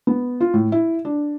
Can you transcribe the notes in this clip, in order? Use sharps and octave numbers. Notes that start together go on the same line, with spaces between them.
B3
F4
A2
E4
D4